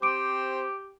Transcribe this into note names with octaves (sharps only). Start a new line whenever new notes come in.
C4 G4 C5 D6 D7